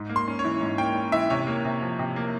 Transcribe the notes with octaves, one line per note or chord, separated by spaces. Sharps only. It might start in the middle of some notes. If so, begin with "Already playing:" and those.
Already playing: G#2
A#3
C6
C#4
C#5
E3
G#2
A#3 G5
C#4
E3 E5
C3 C#5
A#3
C3
F3
C3
A#3